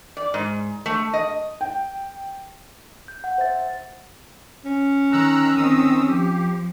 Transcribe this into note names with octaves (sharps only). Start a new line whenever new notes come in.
D5
G#2
A3
D#5
G5
G6
F#5
C5 E5 A6
C#4
D#3 A#5 E6 F#6
D#3 C4 D#6 E6
F3 G4